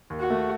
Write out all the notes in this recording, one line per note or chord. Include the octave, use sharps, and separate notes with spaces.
D#2
F#4
A3